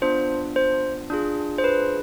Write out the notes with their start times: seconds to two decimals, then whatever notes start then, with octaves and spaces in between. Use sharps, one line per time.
0.02 B3 D4 F4 C5
0.56 C5
1.10 D4 F4 G#4
1.58 C5
1.64 B4